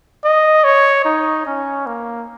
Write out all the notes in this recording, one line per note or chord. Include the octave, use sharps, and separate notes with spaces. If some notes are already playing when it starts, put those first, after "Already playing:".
D#5
C#5
D#4
C#4
A#3